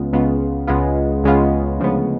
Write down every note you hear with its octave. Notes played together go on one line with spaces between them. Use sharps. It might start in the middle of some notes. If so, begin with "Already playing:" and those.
Already playing: C#2 C#3 G#3 B3 F4
C#2 C#3 G#3 B3 F4
C#2 C#3 G#3 B3 F4
C#2 C#3 G#3 B3 F4
D2 C#3 F3 G#3 B3